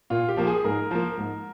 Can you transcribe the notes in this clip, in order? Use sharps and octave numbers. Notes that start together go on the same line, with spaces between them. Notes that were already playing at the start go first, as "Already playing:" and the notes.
A#2 F4
G4
F3 A#3
G#4
G#2 A#4
F3 A#3
G#2